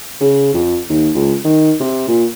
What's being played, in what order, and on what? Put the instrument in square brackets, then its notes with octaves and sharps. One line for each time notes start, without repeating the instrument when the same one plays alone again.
[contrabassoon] C#3
F2
D#2
C#2
D#3
C3
A#2